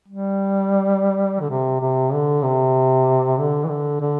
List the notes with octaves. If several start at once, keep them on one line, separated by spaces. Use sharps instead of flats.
G3
D3
C3
C3
D3
C3
D3
E3
D3
D3